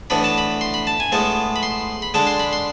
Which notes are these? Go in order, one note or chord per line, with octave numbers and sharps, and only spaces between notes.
A2 E3 B3 D4 B5
A5
B5
C6
B5
A5
G#5
A2 G#3 B3 A5
B5
C6
B5
D3 G#3 D4 A5
C6
B5
C6